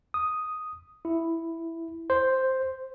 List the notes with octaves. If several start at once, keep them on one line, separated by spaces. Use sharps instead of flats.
D#6
E4
C5